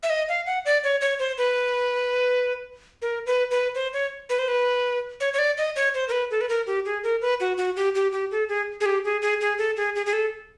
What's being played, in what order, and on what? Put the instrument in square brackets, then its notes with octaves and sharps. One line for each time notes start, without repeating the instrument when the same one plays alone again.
[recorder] E5
D#5
F5
F#5
D5
C#5
C#5
C5
B4
A#4
B4
B4
C5
C#5
B4
C5
B4
C#5
C#5
D5
D#5
C#5
C5
A#4
B4
A4
B4
A#4
G4
G#4
A#4
B4
F#4
F#4
G4
G4
G4
A4
G#4
G#4
G4
G#4
G#4
G#4
A4
G#4
G#4
G#4
A4